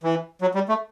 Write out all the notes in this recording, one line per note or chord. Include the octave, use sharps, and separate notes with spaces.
E3
F#3
G3
A3